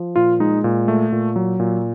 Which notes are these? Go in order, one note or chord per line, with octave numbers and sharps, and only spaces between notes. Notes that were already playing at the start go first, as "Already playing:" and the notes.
Already playing: F3
A#2 F4
G#3 D#4
A#2
A3
A#2
F#3
A#2